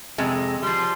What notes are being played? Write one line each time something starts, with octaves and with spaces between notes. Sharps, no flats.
F2 C3 G#3
F3 G3 C6